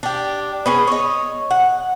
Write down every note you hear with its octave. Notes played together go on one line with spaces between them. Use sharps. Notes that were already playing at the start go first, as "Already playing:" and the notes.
D4 G4
B3 C#4 G#4
C#5 D#5
F#5